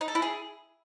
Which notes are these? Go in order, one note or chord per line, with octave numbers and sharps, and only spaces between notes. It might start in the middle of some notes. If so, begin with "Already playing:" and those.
D#4
A4
E4
G#4